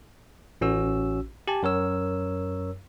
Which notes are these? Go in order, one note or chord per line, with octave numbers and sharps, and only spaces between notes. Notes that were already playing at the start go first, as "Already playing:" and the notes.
A1 C#4 F#4 E6
G4 G#5 A5
F#2 A#4 C#5 E6